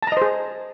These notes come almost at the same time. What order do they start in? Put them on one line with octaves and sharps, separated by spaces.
A5 A#5 D#5 C5 G#4